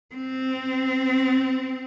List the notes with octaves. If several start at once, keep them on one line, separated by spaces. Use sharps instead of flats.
C4